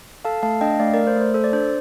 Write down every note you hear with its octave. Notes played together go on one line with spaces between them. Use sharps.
A4 F5 A5
A3 F5 A5
D4 D#5 G5
A3 D5 F5
A3 A#4 D5
C5
A3
C5
A4 C5
D5
D4 C5